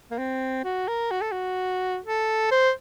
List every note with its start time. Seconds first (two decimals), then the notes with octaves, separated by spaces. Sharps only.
0.11 A#3
0.18 C4
0.64 F#4
0.88 A#4
1.11 F#4
1.21 A4
1.32 F#4
2.05 A4
2.51 C5